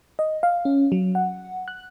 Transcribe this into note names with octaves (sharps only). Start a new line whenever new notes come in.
D#5
F5
C#4
F#3
F#5
F#6